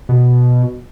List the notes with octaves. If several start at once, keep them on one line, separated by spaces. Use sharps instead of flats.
B2